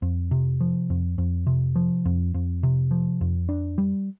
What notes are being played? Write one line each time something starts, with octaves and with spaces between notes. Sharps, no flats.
F2
C3
F3
F2
F2
C3
F3
F2
F2
C3
F3
F2
D4
G3